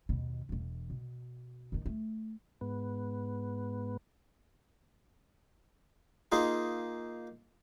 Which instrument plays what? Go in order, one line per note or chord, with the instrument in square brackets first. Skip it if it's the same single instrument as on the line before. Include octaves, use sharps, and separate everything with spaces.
[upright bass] D#2 B2
E1 E3
B2
D#3 D#4
A3
[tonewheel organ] G#2 B3
[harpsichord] A#3 D#4 F4 G#4